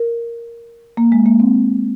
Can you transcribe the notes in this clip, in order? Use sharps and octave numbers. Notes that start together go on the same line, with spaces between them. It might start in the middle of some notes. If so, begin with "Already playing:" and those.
Already playing: A#4
A#3
G#3
A#3
C4